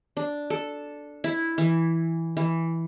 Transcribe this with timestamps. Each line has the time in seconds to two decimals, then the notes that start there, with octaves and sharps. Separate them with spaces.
0.17 D4
0.50 A4
1.24 E4
1.58 E3
2.37 E3